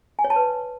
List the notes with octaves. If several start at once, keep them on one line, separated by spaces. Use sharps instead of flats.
G#5
C#5
A5
B4